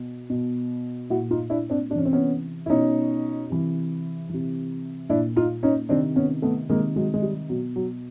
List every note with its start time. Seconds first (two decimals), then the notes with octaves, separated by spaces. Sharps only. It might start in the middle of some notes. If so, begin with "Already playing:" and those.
Already playing: B2
0.30 B2
1.10 A#2 E4 F#4
1.31 D#4 F4
1.50 D4 E4
1.70 C4 D4
1.90 C3 D4
1.95 E3 C#4
2.05 C4
2.13 B3 C#4
2.66 E4
2.69 B2 C#4 D#4
3.50 C3 E3
4.29 C3 E3
5.09 A#2 D4 E4
5.36 D#4 F4
5.63 C#4 D#4
5.89 C3 D#3 C4 D4
6.16 B3 C#4
6.42 A3 B3
6.69 C3 D#3 G#3 A#3
6.96 F#3 G#3
7.14 G#3
7.22 G3
7.49 B2 F#3
7.76 F#3